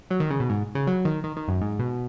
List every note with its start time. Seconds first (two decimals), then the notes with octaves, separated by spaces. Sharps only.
0.10 F#3
0.20 D#3
0.30 C#3
0.40 B2
0.50 G#2
0.75 C#3
0.87 F#3
1.05 D#3
1.24 D#3
1.37 D#3
1.48 F#2
1.61 G#2
1.79 B2